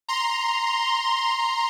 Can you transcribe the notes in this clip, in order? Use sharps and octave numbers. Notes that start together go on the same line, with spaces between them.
A#5 C6